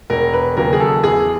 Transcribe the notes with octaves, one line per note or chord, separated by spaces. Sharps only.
E1 A#4
B4
D#2 C#3 F#3 A#4
G#4
A4
E2 G#4